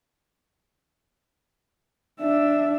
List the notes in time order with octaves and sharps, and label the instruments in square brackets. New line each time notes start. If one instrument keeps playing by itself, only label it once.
[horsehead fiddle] D4 E5